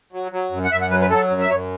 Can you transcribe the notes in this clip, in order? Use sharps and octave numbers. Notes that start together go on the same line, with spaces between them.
F#3
F#3
F#2
F#5
F#2 E5
F#5
F#3 B4
B4
F#3 A4
F#2
E5
F#2 C#5